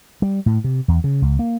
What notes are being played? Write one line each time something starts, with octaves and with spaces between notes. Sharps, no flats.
G3
A2
C3
E2
C#3
C#2
A#3